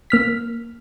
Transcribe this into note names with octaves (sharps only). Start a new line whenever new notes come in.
A#3 F6 B6